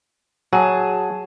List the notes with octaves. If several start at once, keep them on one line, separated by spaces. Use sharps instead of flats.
F#3 G#4 A5